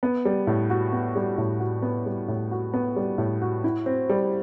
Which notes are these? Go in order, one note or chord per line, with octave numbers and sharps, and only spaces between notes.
B3
G3
A2
F#4
B3
G3
A2
F#4
B3
G3
A2
F#4
B3
G3
A2
F#4
E4
C4
G3